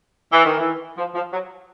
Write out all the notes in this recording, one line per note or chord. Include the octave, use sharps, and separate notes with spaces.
E3
D#3
E3
F3
F3
F#3